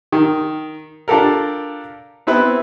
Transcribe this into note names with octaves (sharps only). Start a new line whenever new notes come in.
D#3
D4 F4 G4 A4 A#4
B3 C4 E4 B4